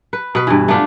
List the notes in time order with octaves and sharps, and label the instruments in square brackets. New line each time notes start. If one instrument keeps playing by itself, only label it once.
[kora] B4
B2 B4
G2 E3
A3 B3 D4 F4